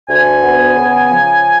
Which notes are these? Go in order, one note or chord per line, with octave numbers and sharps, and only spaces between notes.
D2 G#5
B3
C#3
F3